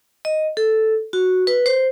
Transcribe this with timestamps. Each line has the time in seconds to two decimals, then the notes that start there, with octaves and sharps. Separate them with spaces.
0.25 D#5
0.57 A4
1.13 F#4
1.47 B4
1.66 C5